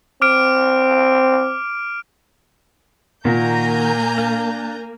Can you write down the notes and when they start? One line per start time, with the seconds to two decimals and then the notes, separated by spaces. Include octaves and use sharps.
0.22 C4 D6 F6 D7
3.25 A#2 D#3 A#3 F#4 A#4 G#5 A#5 G6
4.18 D4 F5